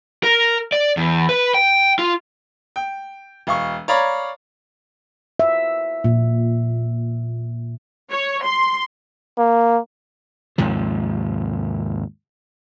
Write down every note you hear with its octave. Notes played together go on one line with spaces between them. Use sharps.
A#4
D5
E2
B4
G5
F4
G5
E1 F5 C#6
C#5 D5 F5 A#5 B5
E5
A#2
C#5
C6
A#3
D#2 G#2 C3 F3